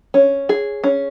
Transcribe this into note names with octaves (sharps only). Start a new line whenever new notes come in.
C#4
G#4
C#4